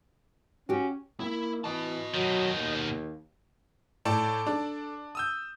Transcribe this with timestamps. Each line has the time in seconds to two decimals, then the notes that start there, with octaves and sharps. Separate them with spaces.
0.69 C#4 F#4 G4
1.20 A#3 E4
1.64 E3 D#5 A5
2.14 B2 D#3 F#3
2.57 D#2
4.05 A2 A4 D5 A5
4.47 D4
5.15 D#6 E6 G6